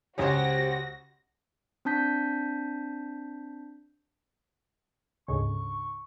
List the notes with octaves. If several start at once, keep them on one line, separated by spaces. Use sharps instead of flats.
C#2 F#4 G4 C5 C#5 A#6
C4 D4 A5 G6 B6
D2 G#2 C#3 C#6